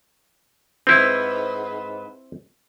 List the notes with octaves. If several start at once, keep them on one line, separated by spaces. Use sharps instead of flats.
G#2 C4 E4 B4